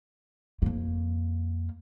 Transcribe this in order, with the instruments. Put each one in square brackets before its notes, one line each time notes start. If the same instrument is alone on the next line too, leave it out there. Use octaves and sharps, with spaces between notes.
[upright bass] F2 A#3